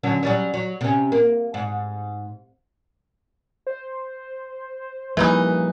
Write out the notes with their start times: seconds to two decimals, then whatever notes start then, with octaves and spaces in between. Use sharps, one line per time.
0.03 D3 F#3 C#4
0.23 F#3 G3 C#4
0.54 F#3
0.81 C3 C#4
1.12 A#3
1.54 G#2
3.67 C5
5.17 C#3 E3 F3 G3 A#3 D#4 B4 E5